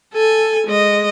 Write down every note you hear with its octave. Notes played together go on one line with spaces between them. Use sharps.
A4 G#5
G#3 D#5